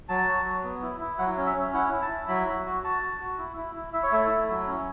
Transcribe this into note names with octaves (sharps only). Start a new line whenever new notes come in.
F#3 A5
F#4
F#3
B3
E4
E4
F#3 F#5
C#4
E5
C#4
E4 F#5
E4
A5
E4
F#3 B5
F#4
F#4
F#4 A5
F#4
F#4
E4
E4
E4
E4 E5
C#5
A3 E5
E4
F#3
C#4